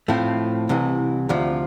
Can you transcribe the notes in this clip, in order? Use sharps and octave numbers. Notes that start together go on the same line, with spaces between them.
A2 F3 A3 C4
C2 C3 E3
D2 C3 F3